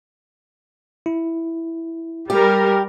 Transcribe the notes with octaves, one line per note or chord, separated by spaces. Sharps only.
E4
G3 G4 A#4